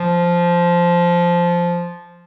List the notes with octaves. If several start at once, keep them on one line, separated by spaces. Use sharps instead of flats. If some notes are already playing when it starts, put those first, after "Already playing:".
Already playing: F3